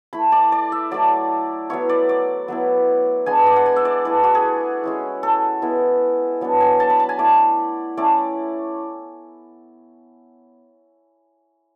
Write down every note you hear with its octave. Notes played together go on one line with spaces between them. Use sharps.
A3 E4 B5
D5
D5
E5
F#3 A3 E4 D5
F#3 B3 E4 C#5
D5
D5
F#3 B3 E4
G#3 B3 D4 G#5
D5
F#5
G#5
E5
D5
A3 E4 B4
F#4
G#4
G#3 C#4 E4
A4
G#3 B3 E4
F#3 B3 D4
G#5
A5
B5
A5
G#5
A3 E4 D5
A3 C#4 E4 D5